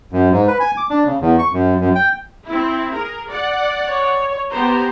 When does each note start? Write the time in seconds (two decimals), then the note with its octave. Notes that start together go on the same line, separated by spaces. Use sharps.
0.12 F#2
0.32 G#2
0.48 B4
0.60 G#5
0.77 D6
0.90 D4
1.06 C#3
1.21 E2
1.39 C#6
1.53 F#2
1.80 F#2
1.95 G5
2.47 C4 E4
2.92 G#4 A#4
3.30 D5 F#5
3.88 C#5
4.51 B3 G4 C5 A#5